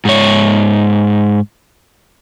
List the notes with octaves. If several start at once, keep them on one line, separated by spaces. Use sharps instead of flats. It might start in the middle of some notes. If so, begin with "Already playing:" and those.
G#2 C#5